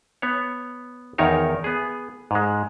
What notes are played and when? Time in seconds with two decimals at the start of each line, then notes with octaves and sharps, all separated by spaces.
0.22 B3 C#5
1.18 E2 D#3 D#4 A#4 C#5
1.64 B3 G#4
2.31 G#2 G#3